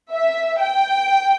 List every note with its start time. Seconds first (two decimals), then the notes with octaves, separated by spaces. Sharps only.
0.12 E5
0.60 G5